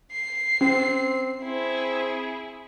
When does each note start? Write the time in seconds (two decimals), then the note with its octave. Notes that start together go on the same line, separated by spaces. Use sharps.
0.12 C7
0.61 C4 C#4
1.44 C4 E4 G#4